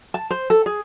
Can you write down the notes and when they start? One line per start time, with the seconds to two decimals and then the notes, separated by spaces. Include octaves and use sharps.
0.14 A5
0.31 C5
0.50 A4
0.66 G#4